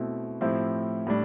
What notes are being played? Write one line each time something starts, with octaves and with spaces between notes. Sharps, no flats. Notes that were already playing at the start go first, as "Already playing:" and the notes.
Already playing: B2 A3 C4 E4
A2 F3 C4 E4 G4
A2 G3 D4